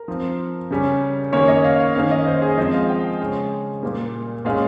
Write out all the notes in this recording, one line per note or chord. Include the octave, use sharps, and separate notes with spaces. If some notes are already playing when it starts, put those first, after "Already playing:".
Already playing: A#4
F3 C4
C#3 G3 C#4
D#3 A#3 C#4 C#5
D#5
F5
F5
D#3 A#3 C#4 F5
D#5
C5
G#4
F3 G#3 C4 D#5
F5
G5
C#3 G#3 C#4
A#2 G3 A#3
A#2 G#3 C#4 F5